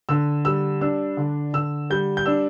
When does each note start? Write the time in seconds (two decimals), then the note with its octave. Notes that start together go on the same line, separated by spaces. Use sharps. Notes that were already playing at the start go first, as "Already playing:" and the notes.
0.09 D3 E6
0.45 G3 E6
0.81 D4 E6
1.17 D3
1.54 D3 E6
1.90 G3 G6
2.17 G6
2.26 D4 E6